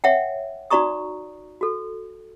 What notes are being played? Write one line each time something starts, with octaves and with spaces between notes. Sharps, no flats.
C#5 E5 F#5 G5
D#4 F#4 D5 A#5 C#6 D#6
F#4 A4